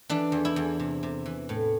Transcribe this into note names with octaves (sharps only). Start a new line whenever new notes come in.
E3 D4
E2
E4
E2
C3
C3
E3
A2